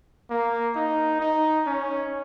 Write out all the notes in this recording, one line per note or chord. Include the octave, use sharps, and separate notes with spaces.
A#3
D#4
D#4
C#4